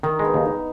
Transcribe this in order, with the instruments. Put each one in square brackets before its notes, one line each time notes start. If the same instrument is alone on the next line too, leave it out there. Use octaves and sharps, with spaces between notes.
[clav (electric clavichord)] D#3 [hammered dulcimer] D#4
[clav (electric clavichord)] G#3
[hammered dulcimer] B3
[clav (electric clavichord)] D#2
[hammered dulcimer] D#4